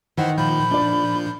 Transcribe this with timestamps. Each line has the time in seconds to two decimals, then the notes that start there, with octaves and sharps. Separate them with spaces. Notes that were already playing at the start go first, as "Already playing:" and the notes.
0.17 D#3 E3 E4 C5 F#5
0.38 A#2 F3 B5 G6
0.71 D4 D5